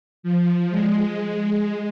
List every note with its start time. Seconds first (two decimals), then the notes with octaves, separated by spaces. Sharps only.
0.23 F3
0.71 G#3